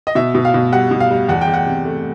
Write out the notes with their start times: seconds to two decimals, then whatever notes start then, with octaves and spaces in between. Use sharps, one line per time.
0.07 D#5
0.15 B2 E5
0.35 B2
0.45 F5
0.54 B2
0.72 G3 F#5
0.91 B2
1.00 F5
1.11 G3
1.29 E2 F#5
1.41 G5
1.47 E2
1.54 F#5
1.66 C3
1.85 A3